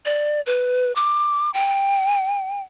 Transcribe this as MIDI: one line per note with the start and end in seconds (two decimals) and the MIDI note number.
0.05 0.41 74
0.46 0.92 71
0.96 1.50 86
1.54 2.62 79